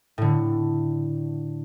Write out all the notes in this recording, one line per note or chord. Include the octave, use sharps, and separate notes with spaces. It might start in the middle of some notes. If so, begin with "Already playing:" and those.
A2 D3